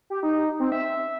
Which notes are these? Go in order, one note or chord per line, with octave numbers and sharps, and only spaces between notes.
G4
D#4
C4
E5